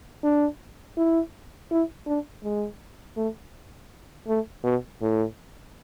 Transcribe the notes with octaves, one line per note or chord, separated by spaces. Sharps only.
D4
E4
E4
D4
G#3
A3
A3
B2
A2